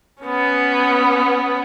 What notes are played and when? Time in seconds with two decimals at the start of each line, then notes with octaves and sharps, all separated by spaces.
0.22 B3 C#4